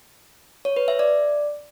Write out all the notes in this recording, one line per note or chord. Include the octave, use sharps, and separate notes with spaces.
C#5
B4
E5
D5